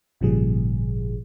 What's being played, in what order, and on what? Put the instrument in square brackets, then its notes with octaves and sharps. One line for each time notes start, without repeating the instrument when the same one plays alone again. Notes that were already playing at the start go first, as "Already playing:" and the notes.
[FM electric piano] G#1 A#2 C#3 F3 G3 G#4